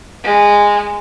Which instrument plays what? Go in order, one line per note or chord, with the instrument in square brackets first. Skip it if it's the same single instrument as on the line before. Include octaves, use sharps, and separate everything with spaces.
[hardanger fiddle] G#3